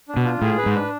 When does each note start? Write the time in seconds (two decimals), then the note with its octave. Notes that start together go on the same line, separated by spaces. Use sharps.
0.09 D4
0.16 B2
0.25 F4
0.42 A2 G#4
0.57 B4
0.66 G#2
0.75 D4